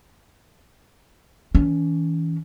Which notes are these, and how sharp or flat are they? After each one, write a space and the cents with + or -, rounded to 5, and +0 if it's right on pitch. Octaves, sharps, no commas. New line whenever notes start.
E3 -35 C#4 +35